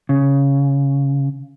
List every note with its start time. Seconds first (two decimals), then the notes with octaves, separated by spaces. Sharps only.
0.09 C#3